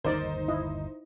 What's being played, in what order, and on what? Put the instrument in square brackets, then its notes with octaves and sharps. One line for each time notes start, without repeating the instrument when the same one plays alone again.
[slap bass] G1 D#2 D#3 [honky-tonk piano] D#4 C5 [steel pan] A#4 D5
[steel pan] E4 D#5